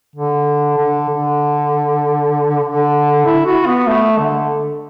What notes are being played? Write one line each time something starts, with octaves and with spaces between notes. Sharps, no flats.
D3
D3
D3
D3
E4
F#4
B3
A3
D3